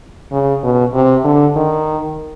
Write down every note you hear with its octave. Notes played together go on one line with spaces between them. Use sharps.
C#3
B2
C3
D3
D#3